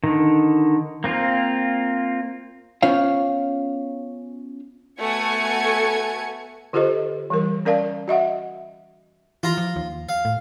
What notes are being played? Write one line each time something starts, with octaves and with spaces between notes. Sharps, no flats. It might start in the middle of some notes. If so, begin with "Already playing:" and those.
D3 D#3
A#3 C4 F4
B3 C#4 F4 C5 C#5 F5
A3 B3 F#4 G#5 G#6 C#7
D3 F4 G4 A4 C5 D#5
E3 G3 A#4
C#4 A#4 D5 F5 A5
F#4 D#5 E5 F#5
E3 F4 A#5
F3
D#2
F5
A2